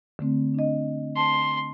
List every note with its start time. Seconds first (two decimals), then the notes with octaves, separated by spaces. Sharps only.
0.19 D3 A3 C4
0.54 D4 D#5
1.17 A5 C6